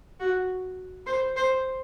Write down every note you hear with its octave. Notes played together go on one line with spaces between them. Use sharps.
F#4
C5
C5